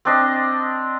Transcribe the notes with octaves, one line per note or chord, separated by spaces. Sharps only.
C4 D4 D#5